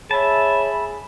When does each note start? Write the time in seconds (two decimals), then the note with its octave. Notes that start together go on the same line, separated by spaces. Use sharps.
0.11 G#4 C#5 E5 A5 B5